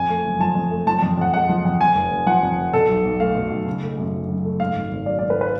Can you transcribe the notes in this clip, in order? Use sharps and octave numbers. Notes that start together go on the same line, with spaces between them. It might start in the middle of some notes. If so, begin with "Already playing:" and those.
Already playing: F2 G#5
A3
F#1
F3 A5
F2
A3
F3 A5
A5
F2
F2 F#5
G#3 F#5
F3
F2
F2 G#5
F1
F1
F3 F#5
F2
F1
B2 A4
B1
B1
A3 F5
B2
B1
C#3
A3
F#2
F#3
C#3
A3
G#2 F5
G#1
G#1
F#3 D5
D5
G#2
B4
B4